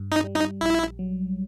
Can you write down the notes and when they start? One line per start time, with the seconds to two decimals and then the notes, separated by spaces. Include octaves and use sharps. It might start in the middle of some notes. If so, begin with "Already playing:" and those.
Already playing: G2
0.12 D#4
0.24 G3
0.36 D#4
0.61 A#1 E4
0.99 F#3